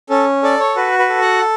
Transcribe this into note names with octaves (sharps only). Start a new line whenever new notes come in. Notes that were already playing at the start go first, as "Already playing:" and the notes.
C#4 A4
A4 D5
C#5
F#4 B4
B4
A4
F#5